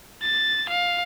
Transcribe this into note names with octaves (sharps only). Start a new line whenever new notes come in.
A6
F5